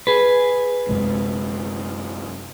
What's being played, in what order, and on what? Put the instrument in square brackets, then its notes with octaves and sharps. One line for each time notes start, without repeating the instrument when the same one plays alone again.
[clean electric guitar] G#4 B4
[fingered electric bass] F#2 C3 G#3